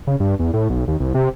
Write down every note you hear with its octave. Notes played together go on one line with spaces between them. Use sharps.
C#3
G2
E2
A2
B1
D#2
C2
C3